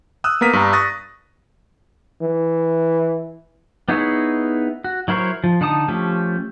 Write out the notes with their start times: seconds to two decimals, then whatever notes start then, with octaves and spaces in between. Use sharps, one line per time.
0.24 D#6 E6 F#6
0.41 A#3 B3 A#4 B6 D#7
0.53 G2 D4 A#5
0.73 C#6 D#6 F#6 A6 A#6
2.22 E3
3.89 B3 D#4 E4 G#4 C#5
4.84 F#4
5.08 F#3 E4 A#4 C5 C#5
5.44 F3
5.61 D3 D#4 A5 D#6
5.88 F3 A3 C#4 G4